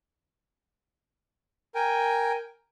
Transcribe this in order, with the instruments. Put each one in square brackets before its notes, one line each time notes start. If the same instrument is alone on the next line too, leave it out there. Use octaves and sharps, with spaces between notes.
[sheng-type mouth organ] A#4 G5 G#5